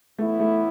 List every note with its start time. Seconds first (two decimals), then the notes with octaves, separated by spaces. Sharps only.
0.18 A2 E3 A3 B3 E4
0.40 A3